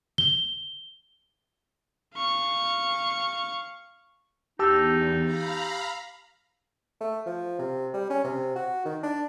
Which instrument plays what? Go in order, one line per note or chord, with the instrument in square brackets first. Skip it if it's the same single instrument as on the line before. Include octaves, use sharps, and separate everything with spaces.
[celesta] G7
[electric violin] F5 C#6
[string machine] E2 [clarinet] D#4 [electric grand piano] G4 A5 E6
[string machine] F5 A#5 B5
[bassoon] A3
F3
C3
G3
C#4
C3
F#4
D#3
D4